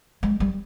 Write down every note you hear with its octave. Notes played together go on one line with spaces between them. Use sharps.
G#3
G3